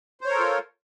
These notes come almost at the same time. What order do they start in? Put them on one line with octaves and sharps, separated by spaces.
C5 C#5 A#4 A4 F4